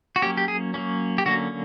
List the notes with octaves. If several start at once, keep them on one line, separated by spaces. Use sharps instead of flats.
F#4
F#3 A#3 C#4 G4
G4
G#4
F#3 A#3 C#4
G4
D3 F#3 A#3 C#4 F#4